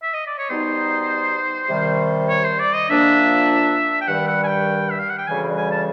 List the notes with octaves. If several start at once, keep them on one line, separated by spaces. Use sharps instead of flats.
E5
D#5
D5
C#5
B2 G3 B3 D#4 C5
C3 D#3 G3
C#5
C5
D5
D#5
A#2 F3 A#3 D4 E5
G5
G2 D#3 G3 F#5
F#5
G#5
G5
E5
F5
F#5
G5
D2 C#3 E3 G3 G#5
G#5
A5